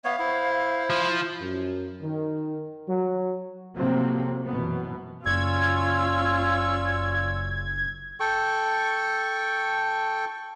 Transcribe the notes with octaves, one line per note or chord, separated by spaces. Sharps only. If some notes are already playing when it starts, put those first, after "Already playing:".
B3 C#5 E5 F5
E4 C5
F3
E4
F#2
D#3
F#3
C3 F3 F#3 A3 A#3 C4
F#2 B2 E3 B3
F#1 C#4 F4 D5 C#6 E6 G#6
A4 G5 C#6